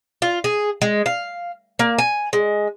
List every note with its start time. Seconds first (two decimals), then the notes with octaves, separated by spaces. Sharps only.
0.22 F4
0.44 G#4
0.82 G#3
1.06 F5
1.79 A#3
1.98 G#5
2.33 G#3